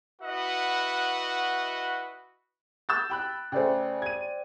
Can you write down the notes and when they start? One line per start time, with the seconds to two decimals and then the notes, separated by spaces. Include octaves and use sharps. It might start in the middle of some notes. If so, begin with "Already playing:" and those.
0.21 E4 F#4 B4 D#5 F#5
2.89 E6 G6 A6
3.10 G5 B5 F#6
3.52 C#3 A3 C5 D5 G5
4.02 G#6 D#7